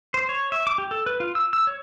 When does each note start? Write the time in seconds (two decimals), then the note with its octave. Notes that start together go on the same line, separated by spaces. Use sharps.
0.14 C5
0.29 C#5
0.52 E5
0.67 D6
0.78 G4
0.91 A4
1.06 B4
1.20 F4
1.35 E6
1.53 E6
1.67 C#5